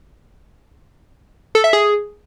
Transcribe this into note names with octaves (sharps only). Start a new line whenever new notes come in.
A4
E5
G#4